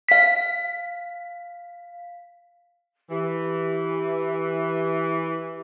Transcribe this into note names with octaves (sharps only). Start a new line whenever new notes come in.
F5 B6
E3 G4